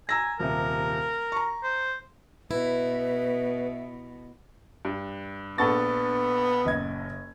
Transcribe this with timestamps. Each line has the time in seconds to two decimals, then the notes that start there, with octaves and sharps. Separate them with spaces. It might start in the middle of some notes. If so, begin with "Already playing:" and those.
0.09 G#5 A#5 E6 A#6
0.40 D#1 C3 A#4
1.32 A#5 C#6
1.63 C5
2.51 B2 E4 B4
4.85 G2
5.58 A#1 B3 D4 A4 F#5 C#6 A6
6.65 F#1 D#5 G#6